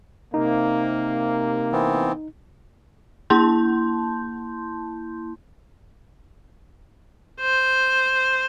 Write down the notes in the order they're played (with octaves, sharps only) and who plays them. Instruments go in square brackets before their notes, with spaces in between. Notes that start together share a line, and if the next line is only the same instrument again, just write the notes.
[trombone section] C3 A#3 [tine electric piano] D#4
[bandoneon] E3 B3 C4
[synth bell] A#3 E4 A5 C6 G6
[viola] C5